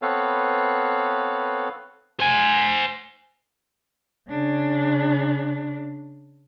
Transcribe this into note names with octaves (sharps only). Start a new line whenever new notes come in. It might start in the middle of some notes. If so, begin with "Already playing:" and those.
B3 C4 A4 B4 C#5 F5
C5 G#5
C#3 D4